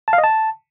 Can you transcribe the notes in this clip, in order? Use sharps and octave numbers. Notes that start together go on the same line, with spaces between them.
A5
F5
D#5
A5